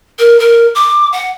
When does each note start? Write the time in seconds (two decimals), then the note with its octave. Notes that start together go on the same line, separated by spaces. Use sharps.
0.19 A#4
0.39 A#4
0.75 D6
1.12 F#5